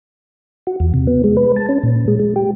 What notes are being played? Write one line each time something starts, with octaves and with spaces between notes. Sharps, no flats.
F#4
E2
C3
B3
G#3
B4
A5
C#4
A#2
G#3
G#3
G4